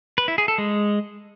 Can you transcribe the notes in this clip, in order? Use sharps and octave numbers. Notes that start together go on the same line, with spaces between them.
B4
E4
G#4
A4
G#3